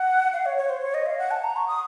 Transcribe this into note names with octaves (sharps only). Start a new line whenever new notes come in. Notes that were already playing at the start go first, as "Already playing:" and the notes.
Already playing: F#5
F5
C#5
C#5
C5
C#5
D#5
F5
F#5
A5
A#5
C#6
D#6